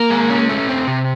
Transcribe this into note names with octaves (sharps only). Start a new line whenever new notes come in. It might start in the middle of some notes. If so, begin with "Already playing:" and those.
Already playing: A#3 A#4
G#3
C#4
A3
C4
C3